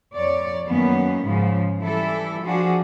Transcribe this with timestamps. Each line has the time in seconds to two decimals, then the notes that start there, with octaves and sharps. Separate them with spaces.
0.16 F2 C#5 D5
0.67 F#2 D#3 A#3 B3 C#4
1.24 G#2 C#3 F3
1.81 E3 G3 E4 A4
2.43 F3 D4 F#4 G#4